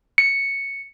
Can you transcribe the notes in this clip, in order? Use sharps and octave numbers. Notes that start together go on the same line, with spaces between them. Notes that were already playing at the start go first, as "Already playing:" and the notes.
C#7